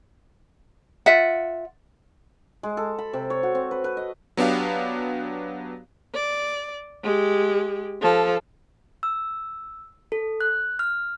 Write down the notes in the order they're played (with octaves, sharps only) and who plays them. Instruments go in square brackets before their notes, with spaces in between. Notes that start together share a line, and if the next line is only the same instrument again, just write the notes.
[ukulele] F4 E5 F#5
[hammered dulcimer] G#3
A4
B5
C3
C#5
F#4
C4
B4
B4
D#5
[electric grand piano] F#3 B3 D4 G4 F5
[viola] D5
G#3 G4
F3 A4
[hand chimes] E6
A4
F#6
F6